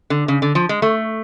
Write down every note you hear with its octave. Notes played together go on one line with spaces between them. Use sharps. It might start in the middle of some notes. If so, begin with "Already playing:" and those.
D3
C#3
D3
F3
G#3
A3